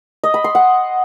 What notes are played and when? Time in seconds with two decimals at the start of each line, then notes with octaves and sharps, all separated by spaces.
0.24 D#5
0.34 B5
0.44 C6
0.55 F#5